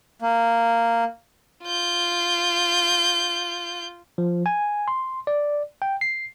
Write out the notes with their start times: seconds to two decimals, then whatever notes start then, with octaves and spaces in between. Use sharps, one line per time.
0.22 A#3
1.64 F4 G6
4.18 F3
4.46 G#5
4.88 C6
5.27 D5
5.82 G5
6.01 C7